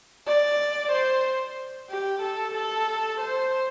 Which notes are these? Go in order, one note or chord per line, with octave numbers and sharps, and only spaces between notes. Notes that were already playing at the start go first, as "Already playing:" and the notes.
D5
C5
G4
A4
A4
C5